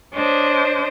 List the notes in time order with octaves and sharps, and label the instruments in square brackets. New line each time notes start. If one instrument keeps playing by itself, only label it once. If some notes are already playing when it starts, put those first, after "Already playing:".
[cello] D4 [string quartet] C5 C#5 D#5